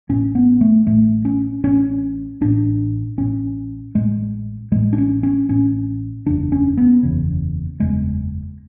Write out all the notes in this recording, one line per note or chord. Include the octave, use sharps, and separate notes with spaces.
A1 A2 C#4
B3
A3
A1 A2 A3
C#4
A1 A2 C#4
A1 A2 D4
A1 A2 C#4
A1 A2 G#3
A1 A2 G#3
D4
C#4
C#4
A1 A2 C#4
F#1 E2 C#3 D4
C#4
B3
F#1 E2 C#3
F#1 E2 C#3 G#3